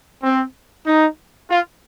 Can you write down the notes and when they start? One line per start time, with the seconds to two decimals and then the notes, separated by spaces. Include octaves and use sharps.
0.23 C4
0.86 D#4
1.49 F4